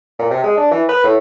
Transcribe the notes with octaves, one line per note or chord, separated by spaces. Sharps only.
A#2
C3
G#3
D4
E3
B4
A2